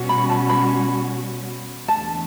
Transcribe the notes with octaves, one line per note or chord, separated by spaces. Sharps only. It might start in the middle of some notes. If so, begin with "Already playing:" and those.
Already playing: B2 G3 C#4 F#4
B5
A5
B5
E2 D3 A3 A5